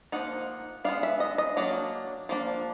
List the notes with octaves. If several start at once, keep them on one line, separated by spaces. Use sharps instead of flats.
F3 A#3 D#4 F#5
G#3 B3 D4 F5
E5
D#5
D#5
F#3 A#3 D4
F3 A#3 D4